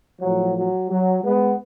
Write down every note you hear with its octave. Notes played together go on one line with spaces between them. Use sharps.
A2 F3 F#3
F#3
F#3
G#3 B3